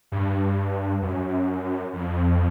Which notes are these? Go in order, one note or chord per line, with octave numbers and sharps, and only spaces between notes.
G2
F#2
F2